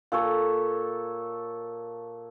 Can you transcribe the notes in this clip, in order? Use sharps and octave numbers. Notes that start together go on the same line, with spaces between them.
A#2 A4 C#5 A#5